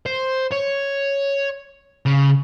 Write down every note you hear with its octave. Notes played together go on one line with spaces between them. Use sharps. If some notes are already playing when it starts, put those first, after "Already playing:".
C5
C#5
C#3